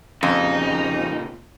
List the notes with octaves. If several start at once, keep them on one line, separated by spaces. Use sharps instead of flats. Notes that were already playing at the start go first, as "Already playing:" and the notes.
F2 A#2 C#3 D#4